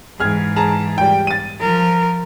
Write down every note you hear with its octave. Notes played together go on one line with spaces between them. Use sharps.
G#2 E3 G#4 F6 G#6
G#4 A5 A#5
G3 G5
A6 D#7
F3 A#4